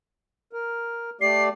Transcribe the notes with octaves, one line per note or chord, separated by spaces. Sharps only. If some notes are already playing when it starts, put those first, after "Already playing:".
A#4
A3 G4 D5 C7